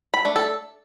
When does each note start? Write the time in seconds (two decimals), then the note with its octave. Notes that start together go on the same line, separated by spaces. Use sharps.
0.14 B5
0.25 A3 D4
0.36 A4